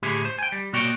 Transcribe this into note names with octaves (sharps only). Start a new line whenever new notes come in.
A2 D3 E4 G4 G#4
C5
G5 G#5
G3
B2 A#3 F#4 C#5 D5 G5